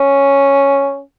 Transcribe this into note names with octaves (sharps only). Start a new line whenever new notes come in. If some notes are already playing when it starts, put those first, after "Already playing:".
Already playing: C#4